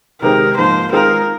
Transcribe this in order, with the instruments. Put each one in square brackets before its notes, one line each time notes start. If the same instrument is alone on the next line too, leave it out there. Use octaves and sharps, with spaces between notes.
[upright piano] C3 D#3 G#3 C4 G#4 [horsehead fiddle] A#4
[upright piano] G#2 F3 A#3 [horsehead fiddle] C5
[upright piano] D#3 G#3 C4 F4 G#4 [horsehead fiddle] A#4